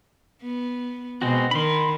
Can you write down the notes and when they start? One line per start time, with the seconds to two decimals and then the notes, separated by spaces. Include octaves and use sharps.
0.43 B3
1.22 B2 G#3 C4 F#4
1.51 D#3 B5 C6